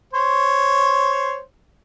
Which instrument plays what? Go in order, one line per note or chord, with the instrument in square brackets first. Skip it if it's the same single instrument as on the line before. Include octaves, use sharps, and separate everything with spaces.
[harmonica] C5 C#5